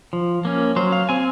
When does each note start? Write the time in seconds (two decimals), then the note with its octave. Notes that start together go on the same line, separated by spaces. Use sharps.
0.13 F3
0.45 A#3 C#4
0.76 F#3 C5
0.92 F5
1.09 C4 G#5